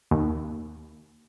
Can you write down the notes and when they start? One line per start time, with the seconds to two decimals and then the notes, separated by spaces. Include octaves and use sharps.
0.11 D#2